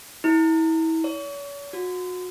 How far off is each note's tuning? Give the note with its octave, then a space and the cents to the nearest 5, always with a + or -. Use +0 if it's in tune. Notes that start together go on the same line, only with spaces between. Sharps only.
E4 -30
C#5 +40
F#4 -30